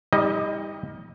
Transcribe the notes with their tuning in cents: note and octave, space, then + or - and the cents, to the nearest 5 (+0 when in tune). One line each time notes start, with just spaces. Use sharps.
G3 +25 D#4 +45 D#5 +0